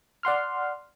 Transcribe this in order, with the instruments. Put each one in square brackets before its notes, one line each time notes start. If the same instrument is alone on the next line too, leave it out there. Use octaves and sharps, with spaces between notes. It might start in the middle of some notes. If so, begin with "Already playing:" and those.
[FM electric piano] D5 F#5 C6 F6